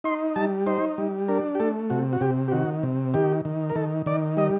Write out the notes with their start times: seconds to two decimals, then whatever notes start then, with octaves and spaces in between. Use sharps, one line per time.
0.04 D#4 C6
0.36 G3 A5
0.66 D#4 C5
0.98 G3
1.28 D4 A#4
1.55 G4
1.60 A3 A4
1.90 C3 F#4
2.13 F#4
2.21 C3 G4
2.48 G4
2.52 D#3 F#4
2.83 C3
3.14 D#3 G4
3.45 D#3
3.69 A#4
3.75 D#3 A4
4.06 D#3 D5
4.37 G3 D#5